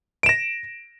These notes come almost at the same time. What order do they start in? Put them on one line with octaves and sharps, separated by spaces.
D7 E7 A#6